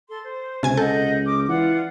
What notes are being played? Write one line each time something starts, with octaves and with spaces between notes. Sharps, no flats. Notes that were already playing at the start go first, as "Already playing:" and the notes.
A4 C6
C5
C#2 C3 G#5 G#6
A4 D#5 F#5 G6
D6 D#6 F6
E3 F4 D5 F#5